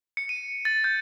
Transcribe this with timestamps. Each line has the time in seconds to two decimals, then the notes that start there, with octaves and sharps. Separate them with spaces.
0.17 C#7
0.29 D#7
0.65 A6
0.84 G6